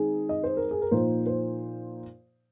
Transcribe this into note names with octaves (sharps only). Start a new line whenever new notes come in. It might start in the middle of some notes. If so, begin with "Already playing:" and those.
Already playing: D#3 G#3 C4 D#4 G#4
D#5
C5
A#4
G#4
A#4
A#2 F3 A#3 D#4 C5
C5